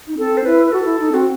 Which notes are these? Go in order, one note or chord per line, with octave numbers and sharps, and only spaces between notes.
D#4
C4 A4
C5
E4 B4
B4
F#4 A4
E4
D#4
C4 F#4